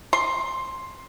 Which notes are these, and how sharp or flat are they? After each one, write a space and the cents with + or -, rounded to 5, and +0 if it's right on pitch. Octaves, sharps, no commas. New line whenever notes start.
C6 +10